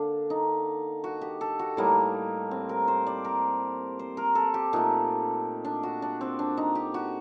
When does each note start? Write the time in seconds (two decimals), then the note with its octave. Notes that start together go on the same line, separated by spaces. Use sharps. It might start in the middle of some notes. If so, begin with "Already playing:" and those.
Already playing: D3 A#3 D4
0.30 D#4
1.04 F#4
1.21 G4
1.41 A4
1.59 F#4
1.77 A2 G3 A#3 D#4
2.51 C4
2.69 A#4
2.88 C5
3.06 D5
3.25 A#4
3.99 C5
4.17 A#4
4.35 A4
4.54 G4
4.73 A#2 A3 D#4
5.65 D4
5.83 F#4
6.02 D4
6.21 C4
6.39 D4
6.57 D#4
6.75 G4
6.94 F#4